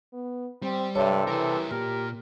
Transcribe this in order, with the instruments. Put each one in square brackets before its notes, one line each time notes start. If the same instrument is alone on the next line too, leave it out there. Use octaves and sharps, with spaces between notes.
[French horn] B3
[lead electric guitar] G3 [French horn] C4
[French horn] G2 [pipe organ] C3 A4 [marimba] C#5 E5
[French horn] E3 [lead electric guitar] E4 A#4
[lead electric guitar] A#2 A#3 [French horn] G4 [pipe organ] A#4